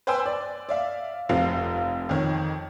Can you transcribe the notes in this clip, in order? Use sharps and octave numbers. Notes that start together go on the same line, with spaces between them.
B4 C5 G5 G#5 C6 E6
D5
D5 E5 F5
F1 C3 F3 F5 C7
F2 D#3 C#5